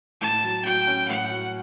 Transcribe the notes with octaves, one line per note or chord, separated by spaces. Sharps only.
A2 A5
F#3
F#4 G5
C#4
A2 F#5
F#3